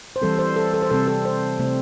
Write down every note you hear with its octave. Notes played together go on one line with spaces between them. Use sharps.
C5
E3 G3 C4 A4
C5
A4
A4
C5
C3 G3 C4 A4
A4
C5
C3 A3 C4